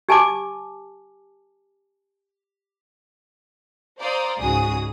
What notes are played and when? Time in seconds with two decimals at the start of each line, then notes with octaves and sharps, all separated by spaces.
0.09 G4 G#5 A5 D6
3.99 C5 D5 F5 A#5 D#6
4.39 C#2 G#2 C#3 F#4 G#4 D#6